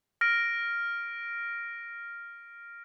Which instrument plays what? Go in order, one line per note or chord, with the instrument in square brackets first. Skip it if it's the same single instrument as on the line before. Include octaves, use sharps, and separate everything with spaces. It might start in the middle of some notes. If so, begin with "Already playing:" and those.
[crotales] F6 A#6 D7